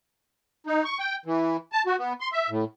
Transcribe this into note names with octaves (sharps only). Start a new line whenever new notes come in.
D#4
C#6
G5
E3
A5
F#4
B3
C6
E5
A2